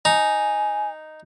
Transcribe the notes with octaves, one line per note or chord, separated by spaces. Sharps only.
D#4 G#5